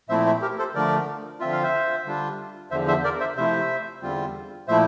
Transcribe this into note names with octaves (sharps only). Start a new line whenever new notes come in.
A#2 F3 A3 C4 E4 C5 E5
C5 E5
G4 A#4
A4 C5
D3 F3 A3 A#4 D5
D3 F3 C4 F4 E5
F5
C5 E5
D3 G3 D4 F4
E2 D3 F3 C5 E5
C5 E5
A#4 D5
C5 E5
C3 F3 A3 E4 C5 E5
E2 D3 G3 C4 F4
A#2 F3 A3 E4 C5 E5